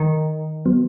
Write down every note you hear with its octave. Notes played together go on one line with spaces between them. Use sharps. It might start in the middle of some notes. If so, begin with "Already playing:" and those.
Already playing: D#3
F#3 B3